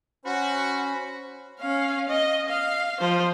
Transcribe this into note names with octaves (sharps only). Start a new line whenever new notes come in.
C#4 F#4 C5 B5
C#4 F5
D#5
F5
F3 C5